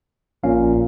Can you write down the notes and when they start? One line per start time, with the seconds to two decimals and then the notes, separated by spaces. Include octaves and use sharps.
0.44 A#1 A#2 C#4 F5